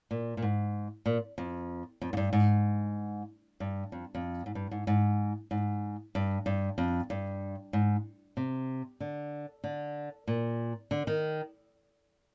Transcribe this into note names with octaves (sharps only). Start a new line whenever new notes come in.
A#2
A#2
G#2
A#2
F2
F2
G#2
G2
G#2
G2
F2
F2
G#2
G2
G#2
G#2
G#2
G2
G2
F2
G2
G#2
C3
D3
D3
A#2
D3
D#3